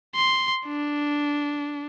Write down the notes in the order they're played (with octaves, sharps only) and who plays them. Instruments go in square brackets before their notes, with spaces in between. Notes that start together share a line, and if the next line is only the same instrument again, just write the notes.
[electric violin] C6
D4